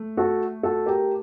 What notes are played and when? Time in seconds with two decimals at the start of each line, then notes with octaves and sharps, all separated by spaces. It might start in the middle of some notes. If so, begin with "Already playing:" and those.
Already playing: A3
0.17 F#4 A4
0.63 F#4 A4
0.86 G4 A#4